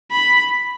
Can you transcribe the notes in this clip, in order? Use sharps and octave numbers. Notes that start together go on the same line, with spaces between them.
B5